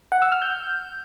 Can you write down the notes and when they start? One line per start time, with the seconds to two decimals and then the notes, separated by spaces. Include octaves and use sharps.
0.12 F#5
0.22 E6
0.32 F6
0.42 G6